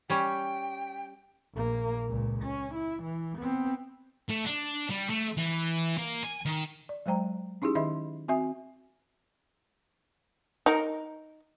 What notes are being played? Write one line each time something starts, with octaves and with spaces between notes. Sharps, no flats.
G3 C#4 G5
A#1 A#3
C#2 A#2
C#4
E4
E3
B3 C4
A3
D4
G3
A3
E3
A#3
G#5
D#3
D5
F#3 G#3 C5 G5 A#5
C#4 D#4 E4 G4 G#4
D#3 D#5 E5 B5 C6
C4 F#4 E5 G#5
D#4 A#4